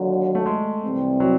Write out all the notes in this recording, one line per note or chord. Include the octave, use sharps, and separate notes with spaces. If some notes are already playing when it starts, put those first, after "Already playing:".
Already playing: D#2 D3 F#3
A3
G#3
C2 C3 E3 G3 C4
F#3